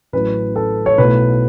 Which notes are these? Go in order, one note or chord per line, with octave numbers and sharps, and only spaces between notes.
A1 A2 F#3 C#4 E4 B4
A4
C#5
B1 B2 A3 E4 B4